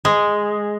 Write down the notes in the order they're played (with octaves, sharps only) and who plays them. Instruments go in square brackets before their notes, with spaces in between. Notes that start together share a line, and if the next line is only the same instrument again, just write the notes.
[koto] G#3